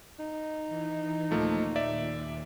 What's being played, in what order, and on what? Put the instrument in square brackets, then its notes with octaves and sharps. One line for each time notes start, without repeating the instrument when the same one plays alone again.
[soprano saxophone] D#4
[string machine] E3
[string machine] D#2 A#2 [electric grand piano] F3 A3 A#3
[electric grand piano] D5 E5